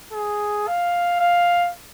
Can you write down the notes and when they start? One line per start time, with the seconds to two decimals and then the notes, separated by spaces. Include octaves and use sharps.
0.13 G#4
0.67 F5
1.20 F5